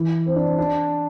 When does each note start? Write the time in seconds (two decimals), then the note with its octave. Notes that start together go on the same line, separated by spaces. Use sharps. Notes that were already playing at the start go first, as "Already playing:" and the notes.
Already playing: E3
0.26 C4
0.36 D4
0.58 D4